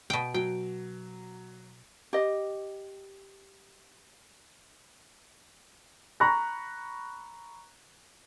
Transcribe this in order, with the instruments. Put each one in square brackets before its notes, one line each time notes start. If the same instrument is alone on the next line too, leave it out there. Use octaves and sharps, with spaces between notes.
[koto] B2 G5
[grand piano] F#3 [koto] G5
[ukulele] G4 D#5
[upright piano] A#5 B5 C#6 F#6 A#6